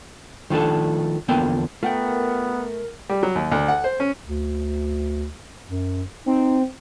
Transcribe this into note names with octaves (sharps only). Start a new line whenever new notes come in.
D#3 F3 A3 D4 A4
E2 D3 F3 A#3 B3 G5
A3 B3 F4 A#4 F#5 G5
G3
F#3
D#2
D2
F#5
C5
C#4
D2
F#2
C4 D#4